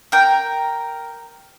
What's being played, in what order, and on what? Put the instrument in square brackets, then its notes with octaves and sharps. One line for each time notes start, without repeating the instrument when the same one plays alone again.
[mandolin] A#4 G5